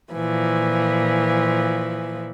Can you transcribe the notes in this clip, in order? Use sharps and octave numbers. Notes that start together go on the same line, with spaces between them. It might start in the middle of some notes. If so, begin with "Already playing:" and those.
A#2 E3 F3